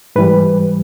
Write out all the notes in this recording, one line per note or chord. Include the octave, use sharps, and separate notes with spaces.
G#2 E3 G3 B4